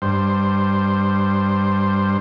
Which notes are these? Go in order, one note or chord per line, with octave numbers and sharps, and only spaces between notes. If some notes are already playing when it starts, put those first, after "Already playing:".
G2 C5